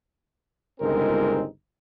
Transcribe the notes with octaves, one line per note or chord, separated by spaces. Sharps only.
G1 C#2 G#3 C4 D#4 A#4